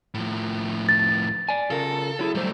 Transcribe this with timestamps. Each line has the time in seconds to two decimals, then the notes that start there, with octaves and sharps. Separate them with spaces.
0.14 A2 F3
0.89 A6
1.49 D5 G#5
1.70 C#3 F4 A4 A#4
2.19 F#3 E4 G#4
2.35 F#3 G3 A3 C5